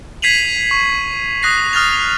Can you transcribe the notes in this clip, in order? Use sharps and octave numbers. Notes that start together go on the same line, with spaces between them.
G#6 B6 C7 D#7 F7 F#7
C#6
D#6 F#6 A#6 C7
D#6 F6 F#6 A6 F7